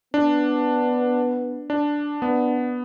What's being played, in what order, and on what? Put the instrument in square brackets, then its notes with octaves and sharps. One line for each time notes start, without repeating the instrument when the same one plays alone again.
[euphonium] B3 [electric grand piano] D4
[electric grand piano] D4
[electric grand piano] B3 [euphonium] D4